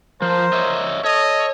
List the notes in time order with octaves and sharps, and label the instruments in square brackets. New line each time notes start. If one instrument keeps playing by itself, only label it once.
[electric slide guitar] F3 [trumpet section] A#4 C5
[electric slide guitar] C#5 D#5 E5
[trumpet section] A4 D#5 [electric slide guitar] C#5